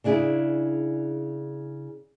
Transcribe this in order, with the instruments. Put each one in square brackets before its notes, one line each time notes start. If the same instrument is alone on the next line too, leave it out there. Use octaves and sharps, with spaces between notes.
[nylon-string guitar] C#3 D4 E4 G#4